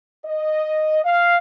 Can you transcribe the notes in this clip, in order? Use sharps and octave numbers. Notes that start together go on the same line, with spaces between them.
D#5
F5